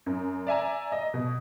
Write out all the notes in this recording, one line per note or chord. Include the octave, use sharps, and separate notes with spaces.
F#2
D5 E5 G#5 A#5
D#5
B2